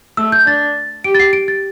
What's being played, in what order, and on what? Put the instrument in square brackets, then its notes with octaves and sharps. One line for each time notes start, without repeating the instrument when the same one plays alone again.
[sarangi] A3 [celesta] E6
[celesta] G6
[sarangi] D4 [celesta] A6
[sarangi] G4 [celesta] D7
[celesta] A6
C7
D7
A6